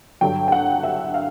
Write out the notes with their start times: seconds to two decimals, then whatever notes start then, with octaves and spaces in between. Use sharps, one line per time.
0.21 G2 D3 F#3 G5
0.48 G5
0.52 F#5
0.83 E5
1.14 F5